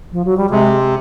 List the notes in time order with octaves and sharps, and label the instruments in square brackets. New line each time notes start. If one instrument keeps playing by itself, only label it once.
[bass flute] F3
F#3
G3
[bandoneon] C3 [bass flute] G#3